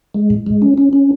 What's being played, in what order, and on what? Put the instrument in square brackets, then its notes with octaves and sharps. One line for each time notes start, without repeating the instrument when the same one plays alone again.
[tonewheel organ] G#3
A2
G#3
C#4
C#4
C#4